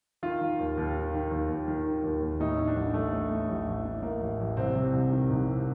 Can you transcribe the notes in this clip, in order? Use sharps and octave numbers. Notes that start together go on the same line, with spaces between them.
D#3 F4
D#3
D#2
D#2
D#3
D#3
D#2
D#2
D#3
D#3
D#2
D#2
A2 D#4
A2
D4
A1
A1 A3
A2
A2
A1
A1
A2
A2 A#3
A1
A1
C2 C4
C3
C2
D#3
C2
C3